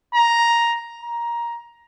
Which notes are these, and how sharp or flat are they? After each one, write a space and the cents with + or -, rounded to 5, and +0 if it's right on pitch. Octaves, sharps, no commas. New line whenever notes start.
A#5 +5
A#5 +15